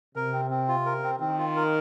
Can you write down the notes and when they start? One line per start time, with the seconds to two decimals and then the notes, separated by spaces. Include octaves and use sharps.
0.15 C3 A#4
0.33 C4
0.51 C4
0.68 F4
0.86 A#4
1.03 C4
1.20 D#3 C4
1.38 F4
1.56 A#4